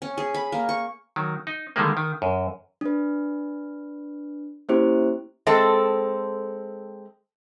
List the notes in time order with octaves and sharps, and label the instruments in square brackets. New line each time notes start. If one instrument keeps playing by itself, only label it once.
[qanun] C#4
G#4
B5
A#3
C#6
[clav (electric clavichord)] D#3 F#3
D#4
D3 D#3 G3 G#3 A#3
D#3
F#2
[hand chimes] D4 B4
A#3 C#4 E4 G4 C5
[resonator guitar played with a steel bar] G#3 C4 A4